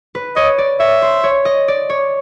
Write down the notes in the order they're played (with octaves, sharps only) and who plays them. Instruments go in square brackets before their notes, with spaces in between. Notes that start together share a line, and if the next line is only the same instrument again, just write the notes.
[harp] B4
[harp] C#5 [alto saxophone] D#5
[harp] D5
[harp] C#5 [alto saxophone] E5
[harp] C5
C#5
D#5
D5
C#5